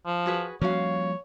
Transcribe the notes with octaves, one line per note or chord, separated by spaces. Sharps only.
F3
F#4 G#4 B4
F3 G3 A#3 C#4 F#4 C#5 F5